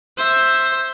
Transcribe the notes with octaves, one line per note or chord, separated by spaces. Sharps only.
C5 E5